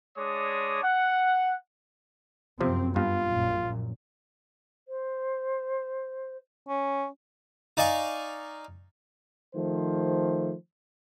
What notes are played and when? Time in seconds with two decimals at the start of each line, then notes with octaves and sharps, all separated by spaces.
0.16 G#3 D4 C#5 D5 D#6
0.83 F#5
2.61 F#2 C3 F3 C4
2.96 G2 B3 F4
3.26 A#1 F#2 A#2
4.88 C5
6.69 C#4
7.77 D#4 D5 F5 G#5 C#6
9.53 D#3 F3 A3 C5